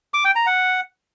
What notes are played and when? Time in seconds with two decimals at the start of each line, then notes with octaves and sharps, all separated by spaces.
0.14 D6
0.25 G5
0.35 A#5
0.46 F#5